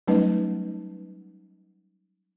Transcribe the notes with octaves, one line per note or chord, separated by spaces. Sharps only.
F#3 G3 A3 C#4 D#4 B4